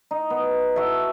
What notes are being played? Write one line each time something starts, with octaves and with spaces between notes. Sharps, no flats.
D#4
B3
F#4 A4 E5